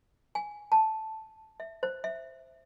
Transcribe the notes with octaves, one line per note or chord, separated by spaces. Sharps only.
G#5
A5
E5
C5
E5